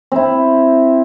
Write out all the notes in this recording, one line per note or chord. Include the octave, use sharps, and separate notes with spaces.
C4 E4